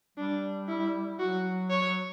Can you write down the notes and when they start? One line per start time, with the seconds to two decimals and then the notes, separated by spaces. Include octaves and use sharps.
0.17 G3 D4
0.68 E4
1.19 F#3 F#4
1.70 C#5